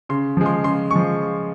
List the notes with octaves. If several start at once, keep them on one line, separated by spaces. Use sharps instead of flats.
C#3 C6
F3 G#3
C6
C#3 C6
F3 G#3 C#6